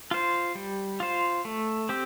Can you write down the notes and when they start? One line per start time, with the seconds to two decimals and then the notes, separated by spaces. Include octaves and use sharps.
0.11 F4 C5
0.55 G3
1.00 F4 C5
1.45 A3
1.89 C4 G4